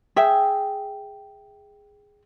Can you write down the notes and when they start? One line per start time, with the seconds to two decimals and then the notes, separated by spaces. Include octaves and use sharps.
0.16 G#4 E5 G5